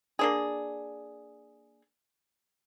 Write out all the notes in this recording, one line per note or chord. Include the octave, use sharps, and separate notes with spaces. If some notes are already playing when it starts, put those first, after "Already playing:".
A#3 D4 G#4